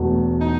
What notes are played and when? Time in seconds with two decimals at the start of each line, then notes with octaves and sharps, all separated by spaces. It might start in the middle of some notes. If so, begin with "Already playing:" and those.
Already playing: E1 E2 B2 F#3 A3
0.41 D#4